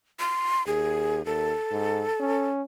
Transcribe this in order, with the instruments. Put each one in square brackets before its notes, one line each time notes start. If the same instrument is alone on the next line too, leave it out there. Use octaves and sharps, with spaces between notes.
[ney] C6
[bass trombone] D#2 [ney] G#4
[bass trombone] D#2 [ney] A4
[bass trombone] G#2
C#4